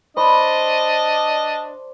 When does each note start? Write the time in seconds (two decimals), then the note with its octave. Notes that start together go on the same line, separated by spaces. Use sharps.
0.17 D4 C5 D5 D#5 B5